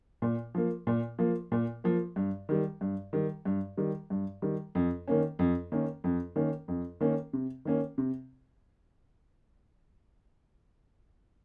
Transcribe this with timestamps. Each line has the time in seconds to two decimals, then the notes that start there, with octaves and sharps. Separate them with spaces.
0.22 A#2
0.55 F3 A#3
0.87 A#2
1.19 F3 A#3
1.52 A#2
1.84 F3 A#3
2.16 G2
2.49 D#3 G3
2.81 G2
3.13 D#3 G3
3.45 G2
3.77 D#3 G3
4.10 G2
4.42 D#3 G3
4.75 F2
5.08 D#3 A#3 C#4
5.39 F2
5.72 D#3 A#3 C#4
6.04 F2
6.36 D#3 A#3 C#4
6.68 F2
7.00 D#3 A#3 C#4
7.33 C3
7.65 D#3 A#3 C#4
7.98 C3